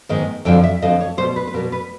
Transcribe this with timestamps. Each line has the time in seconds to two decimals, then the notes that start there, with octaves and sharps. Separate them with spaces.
0.09 G#2 D#3 G#3 B3
0.45 F2 D3 F3 G5
0.64 E5
0.82 F2 D3 F3 D#5
1.01 C#5
1.17 B2 G3 B3 C5
1.36 B4
1.47 B4
1.54 B2 G3 B3 A#4
1.72 B4